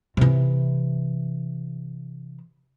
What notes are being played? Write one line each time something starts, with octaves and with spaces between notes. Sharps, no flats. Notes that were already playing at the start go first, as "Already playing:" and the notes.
C3 E3